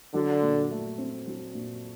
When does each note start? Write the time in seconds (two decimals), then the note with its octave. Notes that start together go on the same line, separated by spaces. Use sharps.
0.14 D3 F#3
0.42 A#2
0.71 A3
0.98 C4
1.27 F#3
1.55 A#2